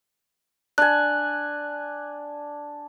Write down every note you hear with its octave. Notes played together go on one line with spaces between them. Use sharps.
D4 G#5 F#6